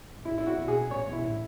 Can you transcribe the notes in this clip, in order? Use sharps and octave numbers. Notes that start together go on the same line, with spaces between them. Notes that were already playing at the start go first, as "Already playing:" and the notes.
G#2
A2 E4
E4
F#4
B2
G#4
A2 C#5
B2
E4
A2